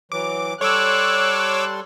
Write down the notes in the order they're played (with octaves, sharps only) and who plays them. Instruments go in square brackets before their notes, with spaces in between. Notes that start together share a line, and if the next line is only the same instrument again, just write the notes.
[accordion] E3 F#3 [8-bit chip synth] D6
[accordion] G3 A4 C6 [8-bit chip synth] C#5 D6 E6 [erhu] F#6